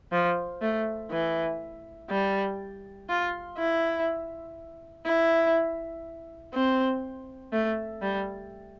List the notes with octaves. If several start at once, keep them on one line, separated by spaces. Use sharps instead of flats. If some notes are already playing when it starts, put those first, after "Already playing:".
F3
A3
E3
G3
F4
E4
E4
C4
A3
G3